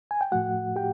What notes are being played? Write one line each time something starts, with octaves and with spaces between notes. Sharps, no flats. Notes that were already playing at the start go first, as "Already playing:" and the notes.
G#5
G5
A2 F3 A3 F#4 F#5
G4 G5